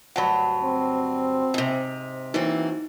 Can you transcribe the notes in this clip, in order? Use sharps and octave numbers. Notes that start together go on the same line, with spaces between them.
D2 G2 F#3 F#5 A5 B5
C4
G#2 C3
E3 F#3 A#3 C4 D#4